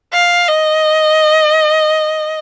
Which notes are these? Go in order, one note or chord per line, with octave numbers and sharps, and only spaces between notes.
F5
D#5